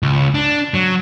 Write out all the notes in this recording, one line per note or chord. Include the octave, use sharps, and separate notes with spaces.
C#2
D4
F#3